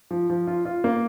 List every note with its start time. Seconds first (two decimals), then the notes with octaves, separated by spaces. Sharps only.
0.11 F3
0.30 F3
0.47 F4
0.65 F4
0.84 A#3